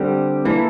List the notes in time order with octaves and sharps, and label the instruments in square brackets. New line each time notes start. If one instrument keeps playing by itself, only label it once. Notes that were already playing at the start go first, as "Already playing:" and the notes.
Already playing: [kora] D3 [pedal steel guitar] G3 C4 G4
[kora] E3 [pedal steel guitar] A#3 E4 A4